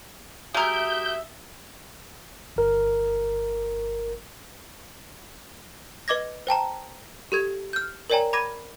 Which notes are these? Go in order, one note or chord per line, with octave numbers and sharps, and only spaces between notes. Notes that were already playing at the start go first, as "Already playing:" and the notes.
G#3 F#4 G4 A#4 E5 D#6 G6
G1 A#4
B4 D#5 D6 G#6 A#6
C5 G5 A5 A#5
G4 A4 G#6
F6 G6
A#4 C#5 D5 G5 G#5 A#5
B5 D6 G#6 A#6 D#7